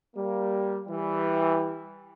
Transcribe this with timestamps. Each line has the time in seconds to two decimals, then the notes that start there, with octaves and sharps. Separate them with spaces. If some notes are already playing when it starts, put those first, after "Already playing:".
0.15 G3 A#3
0.87 E3 G3